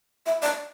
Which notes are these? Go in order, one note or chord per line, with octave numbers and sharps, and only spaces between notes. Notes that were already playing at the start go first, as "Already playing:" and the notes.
E5
D5